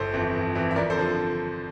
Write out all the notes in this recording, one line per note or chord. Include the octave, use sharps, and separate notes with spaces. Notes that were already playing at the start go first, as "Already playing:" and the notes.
Already playing: G1 A4 C5
F2 E3
G1
F2 E3
E5
F2 A#4 D5
A4 C5
D3 F3